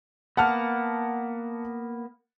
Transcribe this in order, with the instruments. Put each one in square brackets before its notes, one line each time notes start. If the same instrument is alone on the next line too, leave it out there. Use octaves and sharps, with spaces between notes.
[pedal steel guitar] A#3 B3 [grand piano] F#5 A5 F6